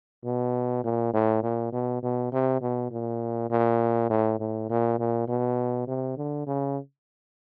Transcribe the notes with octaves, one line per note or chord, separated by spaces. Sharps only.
B2
A#2
A2
A#2
B2
B2
C3
B2
A#2
A#2
A2
A2
A#2
A#2
B2
C3
D3
C#3